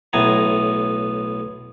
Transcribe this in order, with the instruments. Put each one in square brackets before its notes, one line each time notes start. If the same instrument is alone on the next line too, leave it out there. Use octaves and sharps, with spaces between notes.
[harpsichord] B1 A2 B3 G#5 A#5